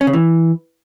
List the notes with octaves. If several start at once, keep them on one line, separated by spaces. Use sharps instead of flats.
C#4
C#3
E3